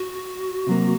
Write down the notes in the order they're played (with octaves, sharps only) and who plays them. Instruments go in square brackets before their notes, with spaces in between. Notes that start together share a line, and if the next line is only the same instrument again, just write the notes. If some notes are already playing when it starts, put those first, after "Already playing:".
Already playing: [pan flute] F#4
[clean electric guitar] C3 F#3 A#3